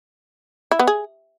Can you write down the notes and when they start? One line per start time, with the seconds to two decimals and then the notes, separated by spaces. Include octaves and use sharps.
0.71 E4
0.79 B3
0.87 G#4